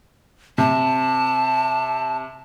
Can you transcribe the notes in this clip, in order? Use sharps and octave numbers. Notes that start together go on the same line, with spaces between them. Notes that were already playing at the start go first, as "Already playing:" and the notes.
C3 A5